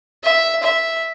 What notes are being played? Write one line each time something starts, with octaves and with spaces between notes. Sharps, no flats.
E5
E5